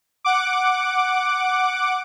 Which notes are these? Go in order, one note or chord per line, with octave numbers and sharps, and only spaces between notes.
F#5 D6